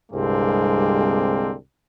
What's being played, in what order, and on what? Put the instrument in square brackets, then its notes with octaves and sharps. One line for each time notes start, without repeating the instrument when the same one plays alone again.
[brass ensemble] C2 G2 D3 G#3 A#3 C4